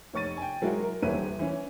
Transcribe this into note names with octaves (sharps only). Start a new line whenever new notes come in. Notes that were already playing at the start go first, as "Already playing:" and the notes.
F1 C#5 C#6 A6 D#7
G5 G#5
F#3 G#3 E4 F#4 A#4
A#4
D#1 E3 E4 B4 C#5 D#7
E3 C#4